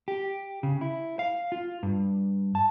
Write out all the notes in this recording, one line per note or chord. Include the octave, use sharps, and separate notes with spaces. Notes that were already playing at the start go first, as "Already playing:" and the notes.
G4
C#3
E4
F5
F4
G2
A5